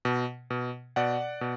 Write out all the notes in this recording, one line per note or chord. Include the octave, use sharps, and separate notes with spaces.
B2
B2
B2 D5 F#5
B2